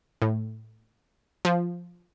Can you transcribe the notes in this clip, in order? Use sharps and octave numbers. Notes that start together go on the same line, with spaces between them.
A2
F3